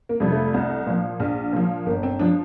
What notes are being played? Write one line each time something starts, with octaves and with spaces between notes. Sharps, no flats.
A#3
F2 C3 G3
A3
C2
A#2 F3
A#1
A#2 F3
G1 A#3
C4
F3 D4